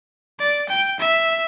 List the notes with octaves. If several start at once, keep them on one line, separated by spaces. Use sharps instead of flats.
D5
G5
E5